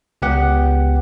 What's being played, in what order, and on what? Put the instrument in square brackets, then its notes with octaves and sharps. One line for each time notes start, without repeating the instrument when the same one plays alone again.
[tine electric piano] C#2 B3 G4 F#5